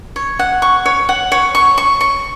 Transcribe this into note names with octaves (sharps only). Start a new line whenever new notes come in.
C#5
F#5
C#6
C#5
F#5
C#5
C#6
C#6
C#6